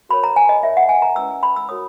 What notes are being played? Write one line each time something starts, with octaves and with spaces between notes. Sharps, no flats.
F#4 A#4 C#5 B5
A#5
G#5
D#5
D#4 A#4 C#5 E5
F#5
G#5
A#5
C#4 E4 B4 E6
B5
E6
D#4 F#4 A#4 C#5 D#6